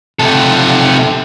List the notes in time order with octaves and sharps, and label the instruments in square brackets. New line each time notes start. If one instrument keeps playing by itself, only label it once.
[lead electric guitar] C3 A4